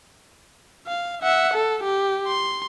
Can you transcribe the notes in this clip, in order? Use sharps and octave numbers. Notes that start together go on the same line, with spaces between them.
F5
E5 F#5
A4
G4
C6